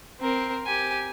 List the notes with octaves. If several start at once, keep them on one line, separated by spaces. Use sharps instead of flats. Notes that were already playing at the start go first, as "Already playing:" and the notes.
C4 A#4
G4 G#5